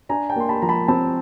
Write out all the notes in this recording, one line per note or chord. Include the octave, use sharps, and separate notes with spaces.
D4 G#5 A#5
G5 A5
A#3 C6
A5 B5
F3 A#5
A5 B5
C4 A5 B5